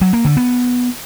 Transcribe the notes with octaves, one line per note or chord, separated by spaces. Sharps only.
F#3
A#3
D3
B3